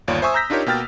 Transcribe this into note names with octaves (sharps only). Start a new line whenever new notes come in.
G1 D#2 F4 C#5 D5
C5 E5 G#5 C#6 D#6 E6
A#5 E6 G6 A#6 B6
D4 D#4 F4 G4 A#4 C#5
B2 A#3 G5 F6 A6